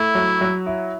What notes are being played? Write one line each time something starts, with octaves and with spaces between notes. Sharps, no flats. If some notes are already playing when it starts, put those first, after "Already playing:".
Already playing: A3 E4
F#3
F#3
E4